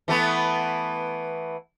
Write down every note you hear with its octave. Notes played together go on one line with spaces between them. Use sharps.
E3 A3 B3